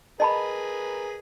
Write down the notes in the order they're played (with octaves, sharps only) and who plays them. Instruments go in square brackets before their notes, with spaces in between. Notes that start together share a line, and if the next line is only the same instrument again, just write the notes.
[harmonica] G#4 A#4 B4 [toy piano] D#5 A5 B5